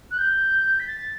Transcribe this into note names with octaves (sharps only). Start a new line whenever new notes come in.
F#6
G6
B6
A6